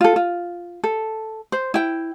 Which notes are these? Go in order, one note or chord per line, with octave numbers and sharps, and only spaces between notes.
F4 A4
F4
A4
C5
E4 G5